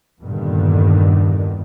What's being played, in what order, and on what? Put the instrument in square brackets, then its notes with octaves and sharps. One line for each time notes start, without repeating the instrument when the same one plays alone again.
[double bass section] E2 G2 A#2 D3 D#3